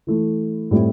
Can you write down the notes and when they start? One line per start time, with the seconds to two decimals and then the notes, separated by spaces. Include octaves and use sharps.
0.07 E3 A3 E4
0.71 A2 G3 C4 E4